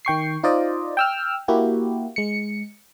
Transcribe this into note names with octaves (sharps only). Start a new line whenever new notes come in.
D#3 G5 C#6 C7
D#4 F4 C5 D5 D#5
G5 E6 F6
A#3 E4 F#4 G4
G#3 C#7